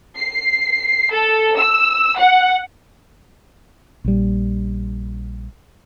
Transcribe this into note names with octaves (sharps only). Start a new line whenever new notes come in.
C7
A4
E6
F#5
A#1 G3